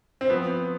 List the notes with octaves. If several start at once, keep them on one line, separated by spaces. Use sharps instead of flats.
C4
F3 B3